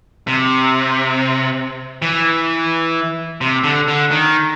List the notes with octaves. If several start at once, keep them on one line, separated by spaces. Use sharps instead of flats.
C3
E3
C3
D3
D3
D#3